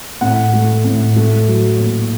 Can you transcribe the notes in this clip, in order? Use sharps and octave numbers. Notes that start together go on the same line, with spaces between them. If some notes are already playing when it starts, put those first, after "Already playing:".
A2 F#5
A3
A2
A3
F#3
A#2